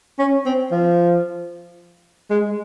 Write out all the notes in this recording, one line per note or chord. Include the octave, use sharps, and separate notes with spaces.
C#4
C4
F3
G#3